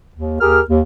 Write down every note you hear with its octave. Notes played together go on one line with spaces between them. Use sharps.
D#2
D#2 G4 G#4 A#4 F6
D#2